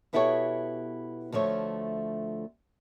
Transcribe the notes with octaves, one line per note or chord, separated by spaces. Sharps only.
B2 B3 E4 G4 A4 C#5
D2 F3 A3 C#5